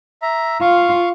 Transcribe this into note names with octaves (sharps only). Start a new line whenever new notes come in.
E5 A#5
F4 F5 C#6